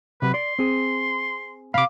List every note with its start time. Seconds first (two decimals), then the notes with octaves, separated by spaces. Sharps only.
0.22 C3 F#3 B4
0.34 D5 C6
0.59 C4 G#4
1.74 A2 C3 F5 B5 D6